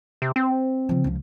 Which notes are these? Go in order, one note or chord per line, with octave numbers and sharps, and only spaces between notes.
C3
C4
C#3 F3
C#2 F3